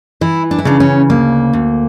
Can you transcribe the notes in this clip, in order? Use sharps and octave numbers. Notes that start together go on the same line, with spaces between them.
E3 E4
D4
E4
C#3 D4
C#4
D2 A#3
D2